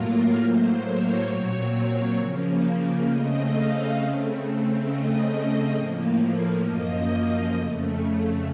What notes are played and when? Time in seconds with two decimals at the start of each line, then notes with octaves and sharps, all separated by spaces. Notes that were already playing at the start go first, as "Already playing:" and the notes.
Already playing: A2 F#3 A#3 F4 A#4
0.36 A2 F#3 A#3 C5
0.81 C#5
1.25 A#2 F#3 C4
2.15 C#3 F3 A#3
3.05 C#3 A3 C4 D#5
3.50 F5
3.95 C#3 A3 C4
4.84 C#3 A3 C4 D#5
5.74 A2 F3 A#3
6.63 F#2 F3 A#3 D#5
7.53 F2 C#3 A3